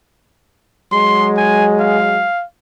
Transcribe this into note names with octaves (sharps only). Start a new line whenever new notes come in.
F#3 G#3 C6
G#5
F5